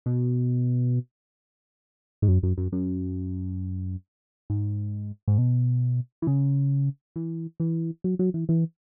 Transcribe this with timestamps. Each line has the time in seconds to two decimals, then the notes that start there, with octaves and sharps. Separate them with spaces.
0.06 B2
2.22 G#2
2.28 F#2
2.43 F#2
2.58 F#2
2.72 F#2
4.50 G#2
5.28 G#2
5.38 B2
6.22 E3
6.27 C#3
7.16 E3
7.60 E3
8.04 F#3
8.19 F#3
8.34 E3
8.49 E3